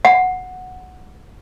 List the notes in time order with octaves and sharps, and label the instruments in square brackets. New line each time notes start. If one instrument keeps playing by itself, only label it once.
[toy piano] F#5